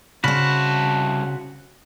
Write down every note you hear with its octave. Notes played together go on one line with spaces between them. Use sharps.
C2 C#3 F#4 C5 A5 B5